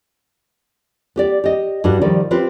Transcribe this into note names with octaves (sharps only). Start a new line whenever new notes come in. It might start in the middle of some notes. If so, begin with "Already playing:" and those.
B3 G4 D5
G4 D#5
G2 D4 F#4 G4
D#3 F3 G3 D5
C4 F4 G4 B4